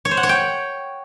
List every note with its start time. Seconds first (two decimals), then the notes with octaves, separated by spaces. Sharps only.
0.05 C#5
0.11 C5
0.17 F#5
0.23 C#5
0.29 G5